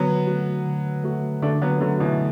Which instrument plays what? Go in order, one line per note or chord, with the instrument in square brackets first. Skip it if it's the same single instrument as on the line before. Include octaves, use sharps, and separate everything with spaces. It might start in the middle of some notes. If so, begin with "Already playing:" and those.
Already playing: [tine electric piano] D3 [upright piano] F#3 B3
[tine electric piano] A3 F#4
D3
A3 F#4
[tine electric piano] D3 [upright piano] A3 D4
[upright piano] F#3 B3
[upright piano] D3 F#3 [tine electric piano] A3 F#4
[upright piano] B2 E3